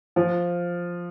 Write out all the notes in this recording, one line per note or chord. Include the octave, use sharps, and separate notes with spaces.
F3